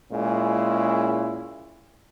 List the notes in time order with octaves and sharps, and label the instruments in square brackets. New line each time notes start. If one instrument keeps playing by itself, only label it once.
[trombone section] A#2 G#3 C#4 E4